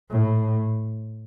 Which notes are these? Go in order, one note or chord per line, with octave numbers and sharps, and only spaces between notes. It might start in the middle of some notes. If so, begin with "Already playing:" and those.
A2